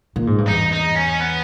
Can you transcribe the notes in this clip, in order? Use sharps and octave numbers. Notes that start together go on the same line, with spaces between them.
A#2
G#2
G2
E2 D#4
D#4
C#4
B3